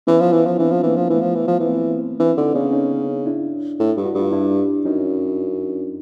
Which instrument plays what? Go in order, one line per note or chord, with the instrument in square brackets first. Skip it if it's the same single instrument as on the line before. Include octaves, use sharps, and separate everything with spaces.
[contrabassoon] E3 [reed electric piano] B3 C#4
[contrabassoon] F3
E3
F3
[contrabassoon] E3 [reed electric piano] C4 D4
[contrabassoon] F3
[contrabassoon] E3 [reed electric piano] A#3
[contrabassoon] F3
[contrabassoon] E3 [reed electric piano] A3 B3
[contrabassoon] F3
E3
F3
E3
[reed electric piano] A#3 C4
[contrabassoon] E3 [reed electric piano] C4 D4
[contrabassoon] D3 [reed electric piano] C#4 D#4
[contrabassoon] C#3 [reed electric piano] B3 C#4
[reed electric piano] C#4 D#4
D4 E4
[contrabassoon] A2
G2
[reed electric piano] F#4
[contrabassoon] G2 [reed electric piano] F4
[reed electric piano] D4 E4
[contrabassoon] F#2 [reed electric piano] C#4 D#4